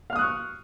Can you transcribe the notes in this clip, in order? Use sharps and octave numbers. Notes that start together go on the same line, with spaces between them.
F5 C#6 D#6 F6 F#6